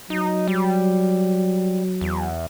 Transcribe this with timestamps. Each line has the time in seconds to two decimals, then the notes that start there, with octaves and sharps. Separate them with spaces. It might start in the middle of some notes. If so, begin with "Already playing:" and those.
0.10 F#3 D#4
0.48 G3
2.01 E2